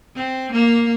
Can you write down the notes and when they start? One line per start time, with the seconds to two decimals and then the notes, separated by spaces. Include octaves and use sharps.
0.15 C4
0.52 A#3